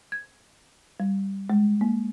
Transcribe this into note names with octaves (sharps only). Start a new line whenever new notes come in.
G#6
G3
G#3
A#3